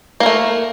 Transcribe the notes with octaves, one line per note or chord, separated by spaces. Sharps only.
A3 A#3 A#4